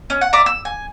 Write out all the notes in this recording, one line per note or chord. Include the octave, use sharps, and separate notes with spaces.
C#4
F#5
D5 E5 A#5
E6
G#5